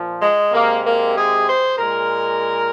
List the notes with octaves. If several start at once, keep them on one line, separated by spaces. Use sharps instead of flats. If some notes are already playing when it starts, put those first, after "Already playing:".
Already playing: A#2 F3
G#3
C3 G#3 A#3
A#3
G#4
C5
A#2 G#3 A#4